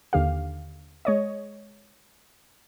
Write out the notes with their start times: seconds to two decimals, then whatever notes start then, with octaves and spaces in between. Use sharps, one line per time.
0.13 D#2 D3 G4 F5
1.05 G#3 C#5 D#5